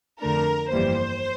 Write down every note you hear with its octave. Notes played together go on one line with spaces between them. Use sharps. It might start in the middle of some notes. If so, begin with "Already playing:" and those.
F2 D3 A3 D4 A#4
G1 F2 E3 G3 A#3 C5